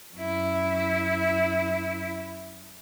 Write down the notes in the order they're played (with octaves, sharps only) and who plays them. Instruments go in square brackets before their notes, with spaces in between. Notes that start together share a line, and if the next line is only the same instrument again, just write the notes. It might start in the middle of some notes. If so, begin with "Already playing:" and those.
[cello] F#2 E4